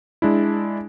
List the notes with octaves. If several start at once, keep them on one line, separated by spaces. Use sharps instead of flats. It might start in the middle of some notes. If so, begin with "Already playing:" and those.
G#3 D4 E4